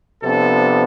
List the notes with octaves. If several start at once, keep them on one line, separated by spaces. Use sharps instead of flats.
C3 F3 B3 D4 A4